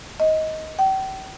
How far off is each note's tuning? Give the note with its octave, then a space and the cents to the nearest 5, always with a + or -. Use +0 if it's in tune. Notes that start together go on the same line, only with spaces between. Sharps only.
D#5 +15
G5 -40